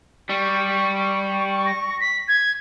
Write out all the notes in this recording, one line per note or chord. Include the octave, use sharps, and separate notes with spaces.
G3 C#6
A#6
B6
G#6